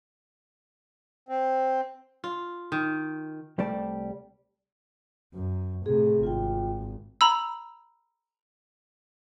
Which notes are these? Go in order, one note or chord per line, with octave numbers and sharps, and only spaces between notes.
C4
F4
D#3
C2 G3 A3 D5 A5
F#2
A2 C3 G#4
G#1 F4 G5
A#5 B5 E6